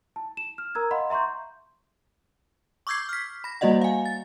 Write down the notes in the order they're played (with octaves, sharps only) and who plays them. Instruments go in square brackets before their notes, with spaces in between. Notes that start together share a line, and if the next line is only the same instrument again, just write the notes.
[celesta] A5
E7
F6
A#4 A#5 E6 G#6
D#5 F5 F#5 B5 C6
E5 A#5 C6 C#6 G6
[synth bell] C#6 D6 E6 G6 G#6 C7
F6 B6
B5 A#6
G3 A#3 F#4 D5 D#5 F#5
F5 G#5
A6